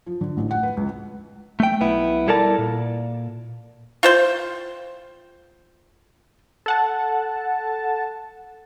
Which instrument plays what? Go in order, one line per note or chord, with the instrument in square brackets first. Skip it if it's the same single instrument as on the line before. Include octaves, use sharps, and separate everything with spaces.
[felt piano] F3
D3
A1
F#5
B4
C#2
[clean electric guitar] A3 G5
B1 B3 E4
G3 E4 A4 A#4 D5 A5
A#2
[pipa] F4 C5 G5
[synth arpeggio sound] A4 F#5 A5